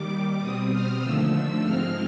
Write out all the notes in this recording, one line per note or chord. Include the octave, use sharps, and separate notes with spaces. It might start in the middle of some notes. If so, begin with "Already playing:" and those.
Already playing: D#2 D#3 G3 D6
B2 G3 C4 D#6
F6
D#2 D3 F3 A3 E6
G#2 F3 G#3 C4 F6